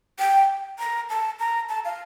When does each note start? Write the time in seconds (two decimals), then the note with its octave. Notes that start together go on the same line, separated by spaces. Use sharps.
0.19 G5
0.79 A#5
1.10 A5
1.40 A#5
1.69 A5
1.85 F5